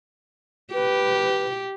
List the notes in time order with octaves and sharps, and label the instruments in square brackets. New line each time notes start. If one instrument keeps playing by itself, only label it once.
[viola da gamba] G4 [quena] B4